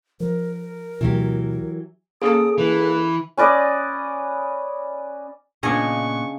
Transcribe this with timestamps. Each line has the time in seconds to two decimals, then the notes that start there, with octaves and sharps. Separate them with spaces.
0.20 F3 A#4
1.01 D2 B2 E3 F#3 G4
2.22 A#3 C#4 G#4 A4 D#6
2.58 E3 B4
3.37 C#4 B4 D5 D#5
5.63 A#2 C#3 B3 D4 D#5 F5 G#5 C#6